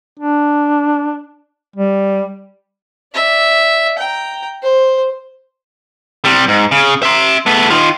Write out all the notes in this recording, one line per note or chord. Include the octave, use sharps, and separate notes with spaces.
D4
G3
D5 E5
G5 A#5
C5
C3 G3
G#2
C#3
E5 C6
A3 B3
D#3 F4